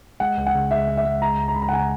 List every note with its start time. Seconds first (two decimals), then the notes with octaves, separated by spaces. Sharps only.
0.20 G#3 F#5
0.38 C#2
0.46 F#5
0.55 C#3
0.71 G#3 E5
0.88 G#3
0.97 E5
1.05 G#3
1.22 G#3 A#5
1.39 C#2
1.48 A#5
1.54 C#2 B5
1.62 A#5
1.69 F#5
1.72 C#3 G#5